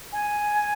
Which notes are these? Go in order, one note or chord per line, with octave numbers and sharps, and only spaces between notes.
G#5